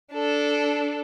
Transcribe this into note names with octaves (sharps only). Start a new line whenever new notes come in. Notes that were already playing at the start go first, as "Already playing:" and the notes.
D4 A4